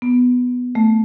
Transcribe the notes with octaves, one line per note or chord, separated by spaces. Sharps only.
B3
A3